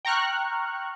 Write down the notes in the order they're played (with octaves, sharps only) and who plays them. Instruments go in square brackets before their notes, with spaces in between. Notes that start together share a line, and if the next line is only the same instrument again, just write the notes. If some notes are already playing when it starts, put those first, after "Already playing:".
[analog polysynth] G5 A#5 C#6 F6 F#6